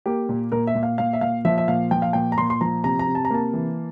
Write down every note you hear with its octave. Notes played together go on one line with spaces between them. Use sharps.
A#3 G4
A#2
A#2 A#4
E5
A#2
F5
A#2 F5
E5
A#2 F5
F3 E5
E5
A#2 F5
F3 G5
F5
A#2 G5
A#5
A#2 C6
C6
F3 A#5
C3 A#5
A#5
C3
A5
A#5
A#3 A5
E3